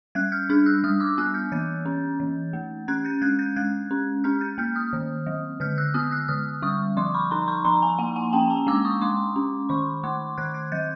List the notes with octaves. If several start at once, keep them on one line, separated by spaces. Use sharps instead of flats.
G3 F#6 G#6
F6 G6
D4 F6 G6
E6 F#6
G3 D#6 F6
D6 E6
B3 E6 F#6
F6 G6
E3 G6 A6
C#4
E3
A3
C#4 F#6 G#6
G6 A6
G#3 F#6 G#6
G6 A6
G#3 F#6 G#6
C#4
C#4 F6 G6
G6 A6
A#3 F6 G6
D#6 F6
D#3
F#3
D3 F6 G6
E6 F#6
B3 D#6 F6
E6 F#6
D3 D#6 F6
G3 C#6 D#6
F3 C6 D6
B5 C#6
D#4 A#5 C6
B5 C#6
F3 A#5 C6
G#5 A#5
A#3 F#5 G#5
F#5 G#5
C#4 G5 A5
G#5 A#5
G#3 D6 E6
C#6 D#6
G#3 C6 D6
C#4
D#3 B5 C#6
A3 C6 D6
D#3 F#6 G#6
F#6 G#6
F#3 G6 A6